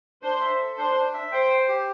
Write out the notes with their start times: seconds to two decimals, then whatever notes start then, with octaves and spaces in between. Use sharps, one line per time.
0.23 D4 C5
0.41 E5
0.59 A4
0.77 D4 C5
0.96 D4
1.14 E5
1.32 C5 G5
1.50 C5
1.68 G4